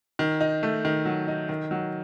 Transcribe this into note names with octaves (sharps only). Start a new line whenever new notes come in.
D#3
D#4
A3
D#3
F#3
D#4
D#3
F#3